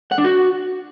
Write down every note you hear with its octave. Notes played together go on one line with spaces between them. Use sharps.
F#5
D4
F#4